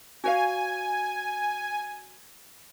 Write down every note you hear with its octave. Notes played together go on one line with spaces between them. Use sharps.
F#4 C#5 F5 G#5